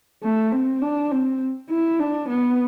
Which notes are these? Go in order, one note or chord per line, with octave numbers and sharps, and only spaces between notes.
A3
C4
D4
C4
E4
D4
B3